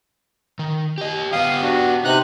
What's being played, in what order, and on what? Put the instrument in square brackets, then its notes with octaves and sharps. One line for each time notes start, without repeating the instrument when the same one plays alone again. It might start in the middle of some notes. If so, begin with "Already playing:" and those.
[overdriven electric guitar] D#3
G4 D#5
[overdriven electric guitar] B3 G4 [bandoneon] F5 D#6
[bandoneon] D4 F#4
[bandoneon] C3 F#6 [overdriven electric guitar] D#4